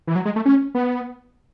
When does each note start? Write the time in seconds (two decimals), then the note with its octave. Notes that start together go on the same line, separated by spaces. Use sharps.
0.07 E3
0.16 F#3
0.25 G#3
0.36 A3
0.46 C#4
0.75 B3